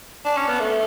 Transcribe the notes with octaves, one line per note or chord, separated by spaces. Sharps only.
D4
C#4
B3
A3